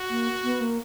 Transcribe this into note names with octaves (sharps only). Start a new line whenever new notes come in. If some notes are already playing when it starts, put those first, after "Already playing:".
Already playing: F#4
A#3
B3
A#3